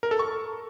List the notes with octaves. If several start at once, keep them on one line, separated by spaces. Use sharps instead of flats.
A#4
A4
C#6